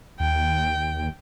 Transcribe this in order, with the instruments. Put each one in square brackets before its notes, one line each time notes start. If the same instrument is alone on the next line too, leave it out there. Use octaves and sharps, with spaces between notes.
[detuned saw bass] D#2 [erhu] G5